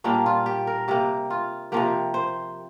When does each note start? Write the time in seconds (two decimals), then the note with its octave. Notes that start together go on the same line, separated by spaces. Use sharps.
0.04 A#2 G3 A#3 D4
0.26 F4
0.46 G4
0.67 A#4
0.88 C3 A#3 G4
1.30 F4
1.72 C3 F3 A#3 G4
2.14 C5